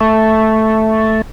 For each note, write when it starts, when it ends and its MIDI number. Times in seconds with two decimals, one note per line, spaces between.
0.01 1.22 57